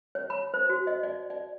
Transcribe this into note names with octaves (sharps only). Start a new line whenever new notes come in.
C#5
B5
C5
F#4
D#5
D5
D5